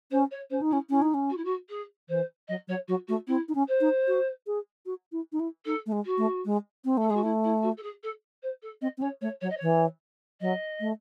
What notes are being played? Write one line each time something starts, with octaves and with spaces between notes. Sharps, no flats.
C#4 C5
C#5
C#4 C5
D#4
C#4 E4
C#4 E4
D#4
C#4
F#4
E4
F#4
G#4
E3 C5
F#3 D#5
F#3 C#5
F#3 F#4
A3 F#4
C4 E4
D#4
C#4
C5
D#4
F#4
G#4
F#4
E4
D#4
E4
D#4 A4
A3
G#3
F#4
A3
G#3
C4
A3 A4
G#3 G#4
F#4
A3 E4
E4
F#4
A4
G#4
A4
C5
A4
C4 D#5
C4
C#4 C#5
A3 C#5
F#3 C#5
D#5
E3 C#5
F#3 D#5
A3